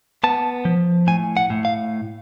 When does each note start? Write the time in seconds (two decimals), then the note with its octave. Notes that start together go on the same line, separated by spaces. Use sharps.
0.24 B3 A5
0.65 F3
1.07 A2 G#5
1.37 F#5
1.50 A2
1.65 F5